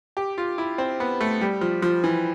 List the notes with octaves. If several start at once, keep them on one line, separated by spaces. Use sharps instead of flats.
G4
F4
E4
C4
B3
A3
G3
F3
F3
E3